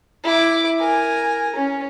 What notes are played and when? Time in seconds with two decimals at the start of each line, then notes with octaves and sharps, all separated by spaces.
0.24 E4 D6
0.79 A#4 G#5
1.56 C#4